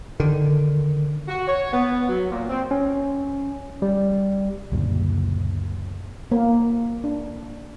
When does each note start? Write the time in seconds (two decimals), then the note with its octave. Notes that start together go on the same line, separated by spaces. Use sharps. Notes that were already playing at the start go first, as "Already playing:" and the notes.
0.20 D3 D#3
1.28 F#4
1.48 C#5
1.73 B3
2.08 F#3
2.31 A#2
2.48 C4
2.71 C#4
3.82 G3
4.72 C#2 F#2 A#2 D3
6.31 A#3
7.04 D4